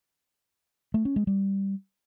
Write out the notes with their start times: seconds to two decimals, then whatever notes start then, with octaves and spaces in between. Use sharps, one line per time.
0.94 A3
1.05 C#4
1.16 G#3
1.27 G3